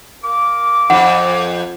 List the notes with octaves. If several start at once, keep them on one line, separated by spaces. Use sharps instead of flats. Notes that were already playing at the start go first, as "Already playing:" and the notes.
A#4 F5 D6
F2 F#5